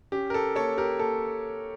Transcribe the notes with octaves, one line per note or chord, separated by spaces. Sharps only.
C#4 G4
A#4
A4
A#3 A4 C#5
G4 A#4
A#3 A4